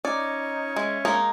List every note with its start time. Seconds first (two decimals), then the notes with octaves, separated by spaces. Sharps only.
0.05 C#4 D#4 D5
0.76 G#3 E5
1.05 G#3 A#3 D#4